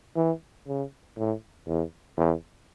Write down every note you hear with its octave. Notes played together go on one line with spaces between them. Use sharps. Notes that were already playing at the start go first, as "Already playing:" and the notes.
E3
C#3
A2
E2
E2